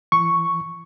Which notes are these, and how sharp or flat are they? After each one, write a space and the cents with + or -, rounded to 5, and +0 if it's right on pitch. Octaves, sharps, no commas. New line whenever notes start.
E3 +40 C#6 +0